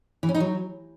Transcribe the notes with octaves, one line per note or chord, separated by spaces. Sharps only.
E3
C#4
D#4
F#3